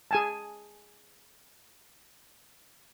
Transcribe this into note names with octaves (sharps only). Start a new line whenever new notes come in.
G#4 G#5 A5